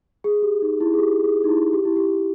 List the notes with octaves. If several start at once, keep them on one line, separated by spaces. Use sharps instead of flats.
G#4
G4
D#4
E4
G#4
G4
G#4
D#4
E4
G4
E4
G4